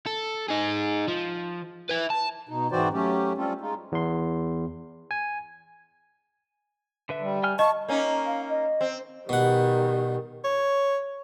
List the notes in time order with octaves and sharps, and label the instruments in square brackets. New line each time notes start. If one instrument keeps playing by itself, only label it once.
[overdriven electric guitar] A4
D#4 G#4
F3
B4 E5
A5
[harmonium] B2 D#4
G#2 E3 C4 F#4 C5 D5
F#3 A3 C#4 G4
G3 C4 C#4 F4 A4
G#3 D#4 F4
[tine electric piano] E2 C6
G#5
[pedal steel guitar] D3 B4 E5
[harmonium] G3
[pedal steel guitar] G5 G#5 F6
[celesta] D#5 [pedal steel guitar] F5 [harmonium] A5 [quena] C#6
[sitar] A#3 C#4 D#4 [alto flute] D#5
[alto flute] F5
D#5
[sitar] C4
[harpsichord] B2 F#5 [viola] D#3 G3
[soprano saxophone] C#5